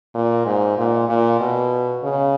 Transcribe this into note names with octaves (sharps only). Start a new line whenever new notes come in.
A#2
G#2
A#2
A#2
B2
C#3